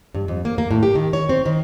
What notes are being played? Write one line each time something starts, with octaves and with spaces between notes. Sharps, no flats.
G2
F2
A#3
A#3
A2
G4
D#3
C#5
C4
D#3